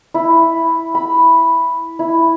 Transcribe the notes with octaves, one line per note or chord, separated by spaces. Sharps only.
E4
B5
E4